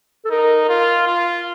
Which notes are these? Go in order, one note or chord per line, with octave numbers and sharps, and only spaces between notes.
A4
D#4 A#4
F4 A#4
F4